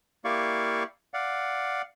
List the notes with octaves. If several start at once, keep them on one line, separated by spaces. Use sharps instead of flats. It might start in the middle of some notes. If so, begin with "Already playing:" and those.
A#3 E4 G4 D5 F5 C#6
D5 F5 F#5